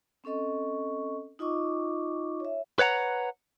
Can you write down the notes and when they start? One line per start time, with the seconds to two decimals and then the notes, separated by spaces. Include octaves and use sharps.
0.24 C4 C#4 A4 D#5 C#6
1.39 D#4 F4 D#5 C#6 D6
2.40 C#5 E5
2.79 B4 C#5 F#5 A#5